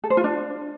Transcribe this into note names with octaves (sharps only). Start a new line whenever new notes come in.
A4
C5
F4
D4